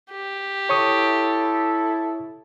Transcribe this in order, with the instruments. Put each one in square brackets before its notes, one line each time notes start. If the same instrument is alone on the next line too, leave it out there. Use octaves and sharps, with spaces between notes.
[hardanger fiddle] G4
[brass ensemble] E4 [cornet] A4 [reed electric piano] C#5 C#6 D#6